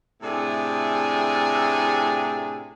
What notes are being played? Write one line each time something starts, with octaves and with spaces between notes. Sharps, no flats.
A2 C3 D4 G#4 A4